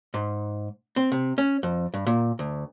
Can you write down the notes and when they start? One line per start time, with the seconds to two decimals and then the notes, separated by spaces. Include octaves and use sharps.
0.14 G#2
0.96 C4
1.12 C3
1.38 C#4
1.63 F2
1.94 G2
2.07 A#2
2.39 D2